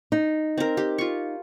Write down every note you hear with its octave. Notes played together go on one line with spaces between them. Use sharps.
D#4
C4 A#4
G4
F4 C#6